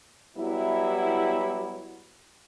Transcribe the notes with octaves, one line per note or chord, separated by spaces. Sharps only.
F#3 G3 B3 E4